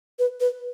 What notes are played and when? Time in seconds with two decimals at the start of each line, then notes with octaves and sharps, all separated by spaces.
0.19 B4
0.40 B4